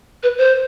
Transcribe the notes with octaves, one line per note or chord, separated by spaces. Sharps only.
B4
C5